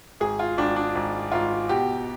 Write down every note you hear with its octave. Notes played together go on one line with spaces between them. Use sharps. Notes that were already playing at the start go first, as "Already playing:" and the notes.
G#1 G#4
F4
G#1 D4
D4
G#1
G#1 F4
B2 G4